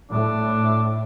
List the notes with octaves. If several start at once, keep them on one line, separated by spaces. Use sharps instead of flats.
A2 D4